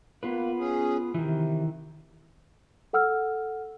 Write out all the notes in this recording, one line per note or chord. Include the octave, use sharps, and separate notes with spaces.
A#3 B3 F4 B4
C#4 G#4
C3 D#3 E3
A4 F#5 E6 F6